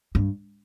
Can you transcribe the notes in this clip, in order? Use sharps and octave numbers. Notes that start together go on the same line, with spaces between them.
G2